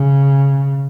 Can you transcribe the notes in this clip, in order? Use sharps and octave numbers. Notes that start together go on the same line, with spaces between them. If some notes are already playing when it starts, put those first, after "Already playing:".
Already playing: C#3